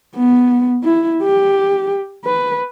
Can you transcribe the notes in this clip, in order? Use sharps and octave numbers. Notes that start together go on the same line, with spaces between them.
B3
E4
G4
B4